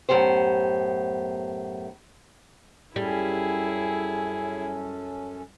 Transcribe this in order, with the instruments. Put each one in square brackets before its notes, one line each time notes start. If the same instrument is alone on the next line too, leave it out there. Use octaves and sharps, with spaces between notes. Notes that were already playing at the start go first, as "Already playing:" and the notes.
[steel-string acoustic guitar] F#2 A2 B3 G4 C5
[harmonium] F#2 C#4 A4 [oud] G3 [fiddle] E4 G#4